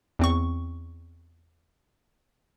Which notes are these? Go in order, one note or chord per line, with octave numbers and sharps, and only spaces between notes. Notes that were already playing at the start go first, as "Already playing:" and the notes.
E2 C4 C#6